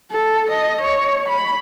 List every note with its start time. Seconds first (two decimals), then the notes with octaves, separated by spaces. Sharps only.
0.12 A4
0.50 D#5
0.81 C#5
1.29 B5